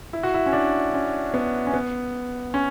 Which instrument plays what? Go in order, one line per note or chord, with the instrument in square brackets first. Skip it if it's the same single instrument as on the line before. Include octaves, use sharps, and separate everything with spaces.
[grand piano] E4
F#4
E4
C#4
D4
C#4
B3
C#4
B3
C#4